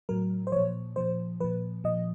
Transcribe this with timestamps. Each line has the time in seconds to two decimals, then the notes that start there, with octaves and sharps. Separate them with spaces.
0.09 A2 F#3 A#4
0.47 C5
0.52 A#2 F3 C#5
0.96 A#2 F3 C5
1.40 A#2 F3 B4
1.84 A#2 F3 D#5